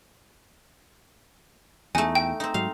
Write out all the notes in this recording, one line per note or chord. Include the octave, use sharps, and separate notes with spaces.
E2 A3 D#4 G#5
G5
C4 D#4
G#2 F#3 F5